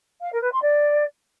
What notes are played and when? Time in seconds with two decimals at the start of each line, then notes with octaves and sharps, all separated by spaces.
0.21 F5
0.31 A#4
0.42 B4
0.52 C6
0.63 D5